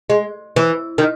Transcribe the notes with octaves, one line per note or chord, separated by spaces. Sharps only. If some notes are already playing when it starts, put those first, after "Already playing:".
G#3
E3
D#3